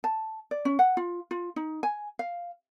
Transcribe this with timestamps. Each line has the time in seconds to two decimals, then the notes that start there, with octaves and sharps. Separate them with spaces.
0.04 A5
0.51 D5
0.65 C#4
0.79 F#5
0.97 F4
1.31 F4
1.56 D#4
1.83 G#5
2.19 F5